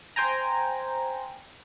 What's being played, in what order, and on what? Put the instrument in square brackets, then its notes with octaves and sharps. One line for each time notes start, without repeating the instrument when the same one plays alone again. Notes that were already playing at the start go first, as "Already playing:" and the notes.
[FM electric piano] C5 G5 G#5 A#5